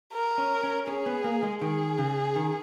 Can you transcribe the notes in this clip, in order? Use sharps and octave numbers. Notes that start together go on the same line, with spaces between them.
A#4
C#4
C#4
C#4 G#4
B3
A#3
G#3
D#3 G#4
C#3
D#3